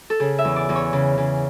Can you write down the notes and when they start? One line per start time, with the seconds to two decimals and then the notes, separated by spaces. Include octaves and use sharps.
0.10 A4
0.20 C#3 G#4
0.39 E5
0.45 E2
0.56 D5
0.69 E2
0.76 C#5
0.93 C#3
1.18 C#3